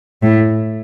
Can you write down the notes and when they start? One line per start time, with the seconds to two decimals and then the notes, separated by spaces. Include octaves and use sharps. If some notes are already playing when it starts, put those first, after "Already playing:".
0.22 A2